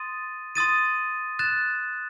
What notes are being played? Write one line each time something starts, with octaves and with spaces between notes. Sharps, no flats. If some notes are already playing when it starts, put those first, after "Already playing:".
Already playing: C6 D#6 A6 D#7
C6 D#6 A6 D#7
F#6 A6 E7